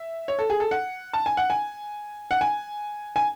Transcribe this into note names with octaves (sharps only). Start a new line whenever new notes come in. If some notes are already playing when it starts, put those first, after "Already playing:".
Already playing: E5
C#5
A4
G#4
A4
F#5
A5
G#5
F#5
G#5
F#5
G#5
G#5